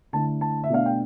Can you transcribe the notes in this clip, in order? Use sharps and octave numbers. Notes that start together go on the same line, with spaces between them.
D3 A3 E4 A5
A5
E5
B2 A3 D4 F5
G5